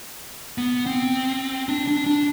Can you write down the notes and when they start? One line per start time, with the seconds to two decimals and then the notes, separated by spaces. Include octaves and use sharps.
0.58 B3
0.86 C4
1.69 D4
1.88 D4
2.06 D4